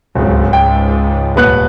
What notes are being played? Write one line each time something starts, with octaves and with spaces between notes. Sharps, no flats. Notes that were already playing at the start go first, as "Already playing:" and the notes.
D1 C#2 G#2
G5
D#1 B3 F#6